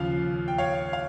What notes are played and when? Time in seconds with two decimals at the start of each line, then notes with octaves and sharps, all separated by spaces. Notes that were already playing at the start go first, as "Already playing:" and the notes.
Already playing: D#2 C#3 F3 F5
0.48 G5
0.58 C#5 F5
0.93 F5